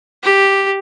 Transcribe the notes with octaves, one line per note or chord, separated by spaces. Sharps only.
G4